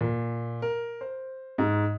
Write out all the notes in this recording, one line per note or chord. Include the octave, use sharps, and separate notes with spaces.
A#2
A#4
C5
G#2